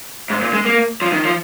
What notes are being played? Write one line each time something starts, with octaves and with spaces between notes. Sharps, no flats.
G#2
A#2
G#3
A#3
F3
D#3
F3